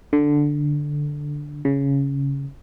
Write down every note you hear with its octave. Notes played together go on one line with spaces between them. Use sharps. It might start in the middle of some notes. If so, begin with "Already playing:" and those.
D3
C#3